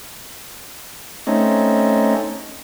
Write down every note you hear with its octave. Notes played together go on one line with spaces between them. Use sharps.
A3 C4 C#4 D#4